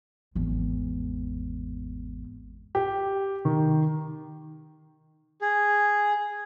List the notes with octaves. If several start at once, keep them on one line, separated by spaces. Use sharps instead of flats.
G#1 E2
G4
D#3
G#4